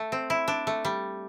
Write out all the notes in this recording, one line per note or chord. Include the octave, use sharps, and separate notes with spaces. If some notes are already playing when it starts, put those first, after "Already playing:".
Already playing: A3
C4
E4
D4
A3
G3